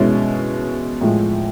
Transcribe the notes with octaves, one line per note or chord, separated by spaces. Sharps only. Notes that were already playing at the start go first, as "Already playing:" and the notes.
Already playing: B2 G#3 C#4 E4
A2 F3 G#3